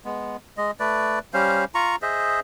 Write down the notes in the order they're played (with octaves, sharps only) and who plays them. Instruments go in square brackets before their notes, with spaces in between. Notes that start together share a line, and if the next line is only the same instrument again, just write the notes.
[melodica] G#3 B3
G#3 D#5
A3 B4 D5
G3 C#4 C5 F5
F4 A#5 C#6
G#4 C5 D#5 E5